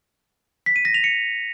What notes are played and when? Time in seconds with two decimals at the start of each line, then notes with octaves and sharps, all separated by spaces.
0.66 B6
0.76 D#7
0.85 A#6
0.94 F7
1.04 C#7